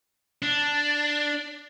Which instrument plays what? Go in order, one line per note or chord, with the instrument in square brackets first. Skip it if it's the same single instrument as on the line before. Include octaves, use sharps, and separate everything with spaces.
[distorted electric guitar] D4